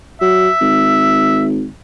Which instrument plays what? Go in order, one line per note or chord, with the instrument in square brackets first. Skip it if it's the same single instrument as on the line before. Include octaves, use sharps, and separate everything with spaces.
[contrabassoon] F#3 [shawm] E5
[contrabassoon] G#1